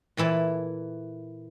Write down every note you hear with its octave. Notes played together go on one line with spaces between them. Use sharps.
A#2 E3 E4 A4